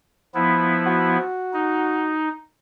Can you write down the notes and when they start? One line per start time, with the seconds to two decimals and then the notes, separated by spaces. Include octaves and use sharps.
0.35 F3 B3 E4
0.86 F#4
1.53 D#4